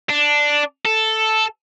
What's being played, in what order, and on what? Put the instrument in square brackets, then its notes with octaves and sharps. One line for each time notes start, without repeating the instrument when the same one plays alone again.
[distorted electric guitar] D4
A4